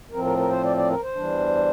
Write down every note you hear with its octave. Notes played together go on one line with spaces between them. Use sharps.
A2 F3 C4 A#4
A#4
A#4
C5
D5
D5
A#4
C5
E2 E3 G3 D4